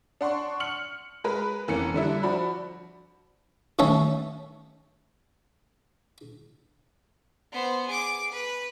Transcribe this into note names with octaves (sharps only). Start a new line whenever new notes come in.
D4 F#5 C6 C#6
F6 C#7 F#7
G#3 A#4 B4
F1 E3 A#3 C#4 C#7
D3 G3 E4
F3 D4 F#4 B5
D#3 A3 C#4 A4 C#5
B3 C5
G#4 D6
B4